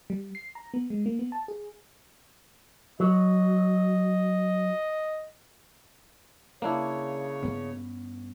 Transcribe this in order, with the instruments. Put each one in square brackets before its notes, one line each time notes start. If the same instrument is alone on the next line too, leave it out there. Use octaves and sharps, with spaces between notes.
[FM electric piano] G3
C7
A#5
B3
G#3
A#3
B3
A5
G#4
[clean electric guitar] F#3 [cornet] D#5
[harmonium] C#3 C#5 [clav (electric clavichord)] A#3 D4 E4
[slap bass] G2 B3 C#4